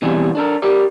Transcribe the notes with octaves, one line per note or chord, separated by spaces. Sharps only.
B2 E3 G3 C4 G#4
D4 A4 A#4
G4 A#4 D5